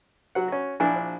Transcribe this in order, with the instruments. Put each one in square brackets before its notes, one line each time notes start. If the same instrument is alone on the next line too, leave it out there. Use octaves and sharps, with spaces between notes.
[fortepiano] F#3 F#5
C#4 F#4
[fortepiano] A#1 D4 E4 [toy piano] G#5
[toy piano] C5